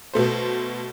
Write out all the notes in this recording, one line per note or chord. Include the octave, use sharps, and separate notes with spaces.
B2 A3 C5